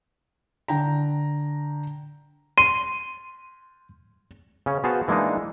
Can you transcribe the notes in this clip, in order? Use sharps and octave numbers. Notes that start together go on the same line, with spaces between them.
D3 G5 A#5
C6 D#7
C#3 C#4
B3 F#4 G#4 C5 F5 A5
E3 G#3 A#3 D4 D#4